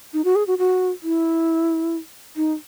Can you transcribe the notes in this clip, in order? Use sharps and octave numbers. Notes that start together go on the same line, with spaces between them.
D#4
F#4
G#4
F#4
F#4
E4
D#4